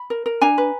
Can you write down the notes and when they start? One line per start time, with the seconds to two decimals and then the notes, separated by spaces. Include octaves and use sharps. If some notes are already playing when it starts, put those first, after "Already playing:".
Already playing: B5
0.10 A#4
0.26 A#4
0.41 D4 G#5 A#5
0.58 B4